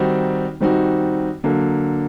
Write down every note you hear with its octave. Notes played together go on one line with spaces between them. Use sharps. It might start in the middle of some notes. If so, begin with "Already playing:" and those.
Already playing: D#3 G3 C4 D#4 F#4
D#3 G3 C4 D#4 F#4
D3 F#3 A#3